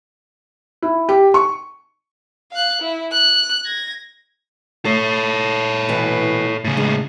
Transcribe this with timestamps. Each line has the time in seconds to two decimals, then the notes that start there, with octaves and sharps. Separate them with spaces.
0.82 E4
1.09 G4
1.34 C#6
2.52 F5 F#6
2.82 E4
3.12 F#6
3.65 G#6 A#6
4.85 A3 A4 C#5
5.89 B2 E3
6.65 A2 C#3
6.77 G#3 D4